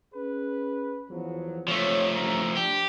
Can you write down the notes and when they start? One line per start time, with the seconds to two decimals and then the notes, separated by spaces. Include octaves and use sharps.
0.15 C#4 G#4 B4
1.10 E2 F3 F#3
1.68 F3 A3 C#5
2.14 A1 G2 A#5
2.57 D4 G4